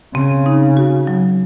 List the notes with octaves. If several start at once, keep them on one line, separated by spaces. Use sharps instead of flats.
C#3 C4
D#4
F#4
F#3